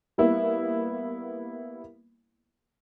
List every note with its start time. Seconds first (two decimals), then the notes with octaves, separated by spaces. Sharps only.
0.18 G3 A#3 B3 E4